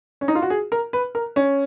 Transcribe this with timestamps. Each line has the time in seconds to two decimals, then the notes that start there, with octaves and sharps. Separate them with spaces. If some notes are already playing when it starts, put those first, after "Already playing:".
0.21 C#4
0.28 D#4
0.35 F4
0.42 F#4
0.50 G#4
0.72 A#4
0.93 B4
1.15 A#4
1.36 C#4